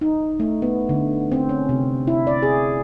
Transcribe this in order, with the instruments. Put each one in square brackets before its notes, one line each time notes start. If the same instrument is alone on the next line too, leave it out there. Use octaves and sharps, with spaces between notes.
[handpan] D#4
A3
B3
D3
C4
C#4
C3
E4
D5
G#4